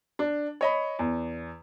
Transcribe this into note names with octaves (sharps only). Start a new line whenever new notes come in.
D4
C#5 D#5 B5
E2